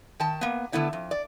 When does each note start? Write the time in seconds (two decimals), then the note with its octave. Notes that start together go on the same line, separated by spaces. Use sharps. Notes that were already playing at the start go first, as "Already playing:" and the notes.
0.20 D#3 G5 A5
0.41 A#3 B3
0.72 D3 A3 B3 E4 D5
0.93 F2
1.11 D5